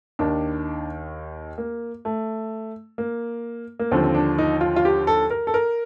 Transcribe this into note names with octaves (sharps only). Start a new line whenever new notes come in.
D#2 D#3 D4
A#3
A3
A#3
A#3
D#2 D3 F3 C4
C4
D4
D#4
F4
F4
G4
A4
A#4
A4
A#4